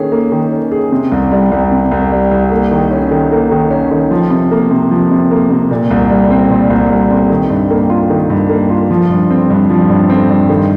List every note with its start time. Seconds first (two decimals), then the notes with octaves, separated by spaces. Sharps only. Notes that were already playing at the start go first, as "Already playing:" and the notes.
Already playing: D#3 A#3 C#4 G#4
0.12 A#3
0.32 D#3
0.52 C#4
0.72 G#4
0.92 C3
1.12 C2
1.32 G3
1.52 C2
1.72 C3
1.91 C2
2.11 G3
2.31 C2
2.51 A#3
2.71 D#3
2.91 C#4
3.11 D#3
3.31 A#3
3.52 D#3
3.71 C#4
3.91 D#3
4.11 F3
4.30 C3
4.52 A#3
4.71 C3
4.91 F3
5.11 C3
5.31 A#3
5.50 C3
5.71 A#2
5.91 C2
6.10 G3
6.31 C4
6.50 A#2
6.70 C2
6.90 G3
7.11 C4
7.30 D#3
7.50 G2
7.71 A#3
7.90 F4
8.10 D#3
8.30 G2
8.50 A#3
8.70 F4
8.91 F3
9.10 G2
9.31 C4
9.50 G2
9.70 F3
9.90 G2
10.10 C4
10.30 G2
10.50 D#3